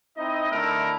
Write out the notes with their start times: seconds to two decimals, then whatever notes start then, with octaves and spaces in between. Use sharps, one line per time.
0.17 C4 D#4 E4 D#5
0.52 D3 A3 E4 A4 A#4